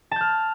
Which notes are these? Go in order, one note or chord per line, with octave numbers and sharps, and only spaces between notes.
A5 F6 G6